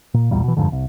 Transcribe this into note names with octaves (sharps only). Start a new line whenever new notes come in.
A#2
B1 E2 A#2 G3
B2 E3
G1 F2 G#2 D3
C2